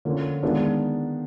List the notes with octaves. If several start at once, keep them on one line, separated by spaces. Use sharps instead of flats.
D3 F3 A#3 C#4
D#3 G#3 B3 D4 F4